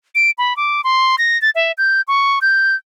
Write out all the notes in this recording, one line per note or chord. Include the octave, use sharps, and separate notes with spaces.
D7
B5
D6
C6
A#6
A6
E5
G6
C#6
G6